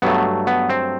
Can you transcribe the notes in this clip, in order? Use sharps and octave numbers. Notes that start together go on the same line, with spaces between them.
G2 F#3 A3 B3
B3
C4